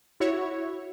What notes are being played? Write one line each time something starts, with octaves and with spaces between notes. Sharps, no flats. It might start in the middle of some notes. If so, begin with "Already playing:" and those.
E4 F#4 C#5